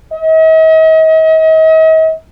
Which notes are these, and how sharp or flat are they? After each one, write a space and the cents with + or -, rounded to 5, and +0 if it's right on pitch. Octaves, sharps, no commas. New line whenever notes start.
D#5 +45